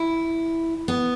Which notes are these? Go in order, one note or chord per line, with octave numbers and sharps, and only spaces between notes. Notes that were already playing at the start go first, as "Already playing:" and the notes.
Already playing: E4
B3